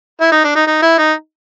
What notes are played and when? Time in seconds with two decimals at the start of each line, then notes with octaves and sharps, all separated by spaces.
0.21 E4
0.32 D#4
0.44 D4
0.56 D#4
0.67 D#4
0.82 E4
0.98 D#4